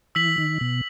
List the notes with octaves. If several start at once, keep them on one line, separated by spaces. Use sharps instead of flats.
E3 E6 B6 F#7
D#3
B2